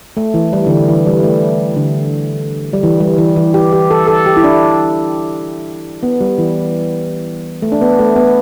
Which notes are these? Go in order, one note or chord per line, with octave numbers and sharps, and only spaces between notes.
A3
E3
G3
D3
E3
E3
G3
A3
D3
G3
E3
G3
E3
E3
G4
G4
A4
A4
G4
E4
D4
B3
G3
E3
A3
D4
B3
A3
B3